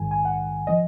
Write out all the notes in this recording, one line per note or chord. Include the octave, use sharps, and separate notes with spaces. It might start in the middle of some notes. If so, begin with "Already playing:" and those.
Already playing: A#1 G#2 D#3 G#5
G#5
F#5
F3 D#5